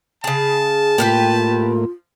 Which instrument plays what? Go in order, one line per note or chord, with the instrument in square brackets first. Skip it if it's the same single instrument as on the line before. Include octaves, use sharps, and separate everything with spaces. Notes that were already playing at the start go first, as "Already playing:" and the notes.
[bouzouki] C#3 G#4 [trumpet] A5
[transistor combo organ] A2 A#3 [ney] F4 [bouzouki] G4 A#4 B4